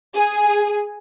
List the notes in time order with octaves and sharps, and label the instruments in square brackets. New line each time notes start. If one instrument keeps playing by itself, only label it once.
[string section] G#4